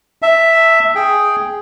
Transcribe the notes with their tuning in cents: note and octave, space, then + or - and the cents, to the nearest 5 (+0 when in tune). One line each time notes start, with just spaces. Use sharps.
E5 +0 A5 +25
G#4 +0 G5 +0